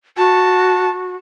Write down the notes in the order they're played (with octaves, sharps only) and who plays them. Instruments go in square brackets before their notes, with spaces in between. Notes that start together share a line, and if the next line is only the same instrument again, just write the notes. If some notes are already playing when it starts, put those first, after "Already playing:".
[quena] F#4 [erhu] A5